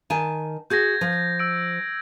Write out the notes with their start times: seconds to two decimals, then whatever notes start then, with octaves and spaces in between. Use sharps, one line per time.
0.10 D#3 G#5 A5
0.70 F#4 G#4 G6 G#6 A#6
1.01 F3
1.39 E6 D7